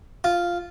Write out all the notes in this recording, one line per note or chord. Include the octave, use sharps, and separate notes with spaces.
F4